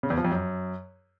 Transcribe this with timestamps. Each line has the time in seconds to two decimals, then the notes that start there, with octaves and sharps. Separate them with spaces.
0.03 C#3
0.10 E2
0.17 F3
0.25 F2
0.32 F#2